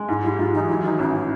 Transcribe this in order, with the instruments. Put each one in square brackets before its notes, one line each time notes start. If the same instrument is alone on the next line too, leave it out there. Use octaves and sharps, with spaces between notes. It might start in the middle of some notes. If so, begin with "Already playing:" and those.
Already playing: [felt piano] G#3
[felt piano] G#2 [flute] E4
[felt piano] G3 [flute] E4
[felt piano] G#2 [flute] F4
[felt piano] E3 [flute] D#4
[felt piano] F#3 [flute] E4
[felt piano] D#3 [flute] D#4
[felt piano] A1 [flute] E4
[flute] E4